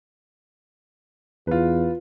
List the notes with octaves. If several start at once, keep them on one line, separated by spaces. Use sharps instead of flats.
E2 F4 B4